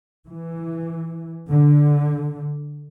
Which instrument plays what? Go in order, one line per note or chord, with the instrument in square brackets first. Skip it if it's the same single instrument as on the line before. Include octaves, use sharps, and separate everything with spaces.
[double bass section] E3
D3